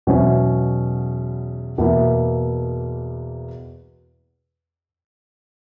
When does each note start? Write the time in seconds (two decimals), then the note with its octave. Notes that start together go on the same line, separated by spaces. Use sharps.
0.07 E2 B2 F#3 C#4 E4
1.78 E2 B2 A#3 E4